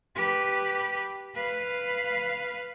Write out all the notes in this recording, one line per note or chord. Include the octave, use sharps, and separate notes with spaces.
G4 B4
B4 F5